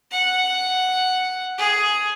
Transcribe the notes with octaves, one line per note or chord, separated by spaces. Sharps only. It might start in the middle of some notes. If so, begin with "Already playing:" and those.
F#5
G#4